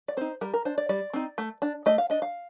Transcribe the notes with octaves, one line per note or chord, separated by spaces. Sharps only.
D5
C4 D#4 C5
G3 A#4
A#4
D4 C5
D5
G3 D5
C4 D#4
A3
D4
A3 D#5
F5
D4 D#5
F5